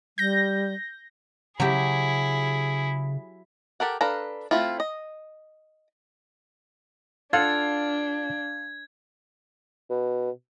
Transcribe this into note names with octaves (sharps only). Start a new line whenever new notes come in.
G3 G6 A#6
C#3 F#3 E4 G4 G#4
G4 A4 A#4 F#5
D4 A4 B4 F5 A#5
A3 C4 E4 F4
D#5
D4 F4 A4 F5 F#5 G#6
B2